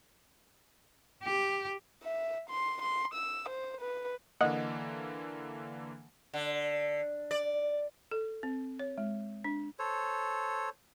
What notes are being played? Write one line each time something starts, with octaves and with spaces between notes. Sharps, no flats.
G4
E5
C6
C6
E6
C5
B4
D3 E3 A#3 D#5 F#5
D3
D5
A4
C4
C#5
G#3
D4
A4 C5 C#5